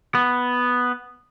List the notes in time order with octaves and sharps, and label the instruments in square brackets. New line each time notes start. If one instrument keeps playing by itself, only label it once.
[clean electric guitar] B3